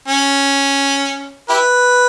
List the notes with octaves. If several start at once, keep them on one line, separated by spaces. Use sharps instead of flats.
C#4
E4 G4 B4